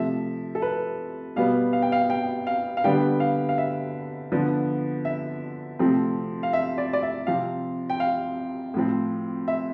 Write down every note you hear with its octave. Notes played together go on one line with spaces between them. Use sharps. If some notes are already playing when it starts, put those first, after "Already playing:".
Already playing: C3 F3 A3 E5
A4
B4
B2 G3 B3 F5
F5
G5
F5
G5
F5
F5
D3 G3 B3 G5
F5
F5
E5
D3 F3 B3
E5
C3 F3 A3 C4
F5
E5
D5
D5
E5
C3 F3 C4 F5
G5
F5
A2 F3 C4
E5